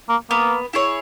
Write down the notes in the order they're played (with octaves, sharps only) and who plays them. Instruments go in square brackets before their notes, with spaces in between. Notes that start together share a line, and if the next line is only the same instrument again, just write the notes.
[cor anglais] A#3
[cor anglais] A#3 [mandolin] B3
[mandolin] E4 G#4 C#5